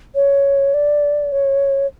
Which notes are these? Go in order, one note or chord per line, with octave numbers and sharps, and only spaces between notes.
C#5
D5
C#5